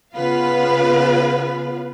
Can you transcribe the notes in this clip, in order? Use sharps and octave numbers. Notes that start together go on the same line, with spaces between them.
C#3 B3 F4 B4 F5